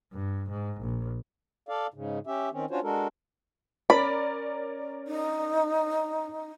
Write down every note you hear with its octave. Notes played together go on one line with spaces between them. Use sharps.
G2
G#2
A#1
A4 D5 F5
G#2 C#3
C#4 G4 E5
D#3 C4 C#4
C#4 D4 F4 F#4 C5 C#5
G#3 D4 F#4 A4 A#4
C#4 A#4 D5 B5
D#4